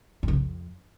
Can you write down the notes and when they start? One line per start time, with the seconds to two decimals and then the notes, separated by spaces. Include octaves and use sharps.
0.23 F#2
0.28 C#3
0.33 F2